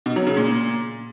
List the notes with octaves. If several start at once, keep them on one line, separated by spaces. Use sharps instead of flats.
B2
F#3
C#3
A#2